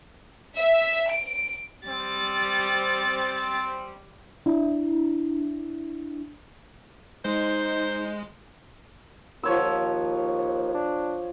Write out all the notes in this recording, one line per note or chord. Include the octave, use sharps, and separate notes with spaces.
E5
D7
G3 C4 A6
D4 E4
G#3 D#4 C5
D#2 F3 C#5 E6
D4